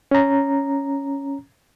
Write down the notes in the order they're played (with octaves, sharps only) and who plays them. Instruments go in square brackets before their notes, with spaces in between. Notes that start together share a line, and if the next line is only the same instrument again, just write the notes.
[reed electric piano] C#4 A#5